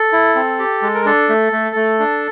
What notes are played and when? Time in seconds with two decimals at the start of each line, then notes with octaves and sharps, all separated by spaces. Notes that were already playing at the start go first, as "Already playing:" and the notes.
Already playing: A4
0.12 E4
0.35 C4
0.59 G4
0.82 G#3
0.95 A#4
1.06 D4 A4
1.29 A3
1.52 A3
1.76 A3
1.99 D4